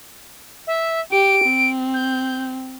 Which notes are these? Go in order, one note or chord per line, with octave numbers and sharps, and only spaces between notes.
E5
G4 D7
C4
G6